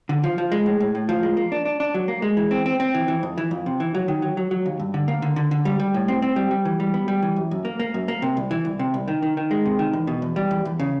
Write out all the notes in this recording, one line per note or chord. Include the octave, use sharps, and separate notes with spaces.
D3
F3
F3
G#3
A2
A2
A2
F3
G#3
A#3
D4
D4
D4
F#3
A#3
G#3
E3
C4
C4
C4
E3
E3
F2
E3
F2
C3
E3
F#3
D#3
F#3
F#3
F#3
D#2
G2
D3
A#3
D3
D3
D3
G3
G3
A2
C4
C4
G3
G3
E3
G3
B3
G3
E3
F#2
F#2
A#3
A#3
F#2
A#3
C3
C2
E3
C2
C3
C2
D#3
D#3
D#3
G#3
C3
D#3
E2
B2
E2
G3
E2
E2
C#3